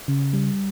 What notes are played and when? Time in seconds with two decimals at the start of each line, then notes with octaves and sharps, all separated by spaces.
0.08 C#3
0.33 G3